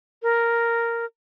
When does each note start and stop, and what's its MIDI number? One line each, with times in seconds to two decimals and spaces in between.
0.23 1.05 70